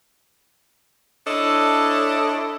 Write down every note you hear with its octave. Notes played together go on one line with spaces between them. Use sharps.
D4 E4 A4 C#5 D#5